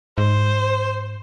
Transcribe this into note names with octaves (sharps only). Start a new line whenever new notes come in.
G#2 C5